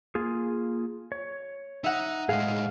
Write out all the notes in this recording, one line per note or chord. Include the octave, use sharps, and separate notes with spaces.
A#3 F4 G#4
C#5
D#4 E5 F#5
A2 G#3 G#4 D#5 F5